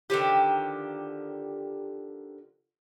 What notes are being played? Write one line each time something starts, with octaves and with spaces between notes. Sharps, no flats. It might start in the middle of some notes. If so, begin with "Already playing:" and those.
D3 D#3 F3 G4